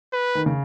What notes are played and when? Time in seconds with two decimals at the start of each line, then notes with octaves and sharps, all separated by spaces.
0.13 B4
0.35 D#3
0.46 C#3